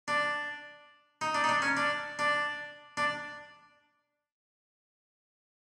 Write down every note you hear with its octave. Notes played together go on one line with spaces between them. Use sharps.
D4
D#4
D4
D#4
D4
C#4
D4
D4
D4